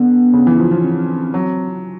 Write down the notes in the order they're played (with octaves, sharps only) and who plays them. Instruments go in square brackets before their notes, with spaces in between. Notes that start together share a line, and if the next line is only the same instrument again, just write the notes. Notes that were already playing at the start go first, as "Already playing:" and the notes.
Already playing: [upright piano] D3 [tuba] B3
[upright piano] C#3
E3
F3
F3
[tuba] C4
[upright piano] F#3